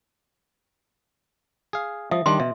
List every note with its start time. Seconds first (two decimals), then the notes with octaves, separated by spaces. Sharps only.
1.73 G#4 F5
2.11 F3 E5 D#6
2.26 D#3 G3 D4 C6
2.40 B2 E5